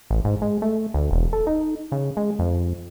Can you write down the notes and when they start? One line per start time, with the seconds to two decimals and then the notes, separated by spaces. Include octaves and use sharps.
0.10 A1
0.25 G#2
0.42 G#3
0.62 A3
0.94 D2
1.11 E1
1.33 A4
1.47 D#4
1.92 C#3
2.17 G#3
2.39 F2